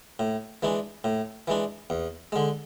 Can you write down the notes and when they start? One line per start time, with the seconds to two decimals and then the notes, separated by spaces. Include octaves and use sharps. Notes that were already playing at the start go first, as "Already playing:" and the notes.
0.19 A2
0.63 E3 G#3 D4
1.04 A2
1.48 E3 G#3 D4
1.90 E2
2.32 D3 G#3